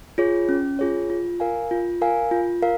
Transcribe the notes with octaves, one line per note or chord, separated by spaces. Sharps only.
F4 G#4 C#5
C#4
F4 G#4 C#5
F4
A#4 F5 G#5
F4
A#4 F5 G#5
F4
A#4 F5